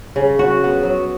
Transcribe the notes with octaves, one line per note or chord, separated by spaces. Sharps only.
C#3
F#4
B3
F#3